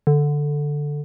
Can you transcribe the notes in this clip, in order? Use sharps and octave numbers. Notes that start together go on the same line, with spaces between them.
D3